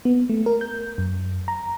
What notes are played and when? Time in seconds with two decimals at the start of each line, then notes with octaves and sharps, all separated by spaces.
0.05 B3
0.29 A3
0.46 A#4
0.61 G6
0.98 F#2
1.48 A#5